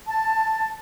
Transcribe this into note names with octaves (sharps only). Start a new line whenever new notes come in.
A5